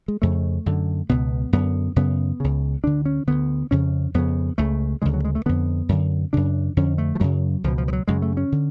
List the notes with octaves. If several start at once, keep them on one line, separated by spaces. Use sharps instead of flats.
G#3
F2 C#3 A3
F#2 D3
C#2 B2 B3
F#2 D3 B3
F#2 C#3 B3
C#2 C#3
D2 D3 D4
C#4
D2 D3 B3
F2 C#3 C#4
F2 C#3 B3
C#2 C#3 A3
D2 C#3 G#3
F#3
G#3
A3
F2 D3 B3
F#2 D3
F#2 C#3 D4
F2 D3 C#4
A3
F3
F#2 C#3 F#3
C#2 B2 F3
F3
F3
F#3
F#2 C#3 G#3
A3
C#4
D3